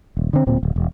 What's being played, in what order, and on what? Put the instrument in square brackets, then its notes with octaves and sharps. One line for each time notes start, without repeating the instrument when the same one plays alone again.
[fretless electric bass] D#1
D3 C4
D1 A#2 C4
D1
E1